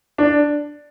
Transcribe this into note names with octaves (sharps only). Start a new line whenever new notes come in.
D4